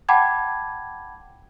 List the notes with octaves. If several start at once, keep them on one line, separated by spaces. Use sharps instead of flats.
F#5 G5 A5 B5 D6 G#6